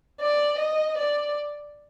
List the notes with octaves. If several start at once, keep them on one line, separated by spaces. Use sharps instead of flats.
D5
D#5
D5